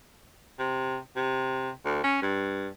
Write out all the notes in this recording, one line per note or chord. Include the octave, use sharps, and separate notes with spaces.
C3
C3
D2
C#4
G2